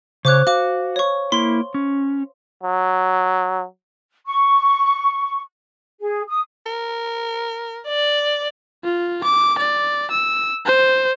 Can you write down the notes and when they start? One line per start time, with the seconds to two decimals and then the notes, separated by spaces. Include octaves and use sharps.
0.25 C#3 C5 C#5 D6 F#6
0.47 F#4 F5 D6
0.96 C#5 C#6
1.32 A#3 E4 C6
1.74 C#4
2.63 F#3
4.26 C#6
6.00 G#4
6.27 D#6
6.66 A#4
7.87 D5
8.84 F4
9.24 D6
9.59 D5
10.11 E6
10.66 C5